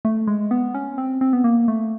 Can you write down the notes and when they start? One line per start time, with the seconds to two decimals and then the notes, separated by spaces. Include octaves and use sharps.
0.05 A3
0.28 G#3
0.51 B3
0.75 C#4
0.98 C4
1.21 C4
1.33 B3
1.44 A#3
1.68 A3